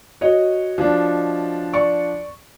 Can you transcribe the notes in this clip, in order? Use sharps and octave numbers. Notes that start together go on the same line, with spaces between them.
F#4 C#5 D#5
F3 D4
D5 C#6